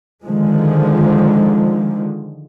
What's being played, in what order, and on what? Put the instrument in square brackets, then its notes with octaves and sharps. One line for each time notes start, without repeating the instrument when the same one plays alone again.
[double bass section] D3 D#3 F3 G#3